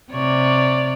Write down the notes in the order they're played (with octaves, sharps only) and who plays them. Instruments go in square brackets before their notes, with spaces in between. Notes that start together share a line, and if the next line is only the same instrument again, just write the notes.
[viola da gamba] C3 C#5 D5